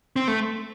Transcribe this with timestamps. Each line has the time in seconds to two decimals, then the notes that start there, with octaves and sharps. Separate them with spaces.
0.16 C4
0.28 A3